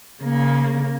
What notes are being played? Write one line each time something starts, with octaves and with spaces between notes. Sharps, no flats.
C#3 A#3